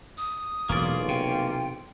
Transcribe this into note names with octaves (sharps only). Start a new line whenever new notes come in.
D#6
E1 B1 E2 A#2 A#3 C#4 F4 D5
C3 G5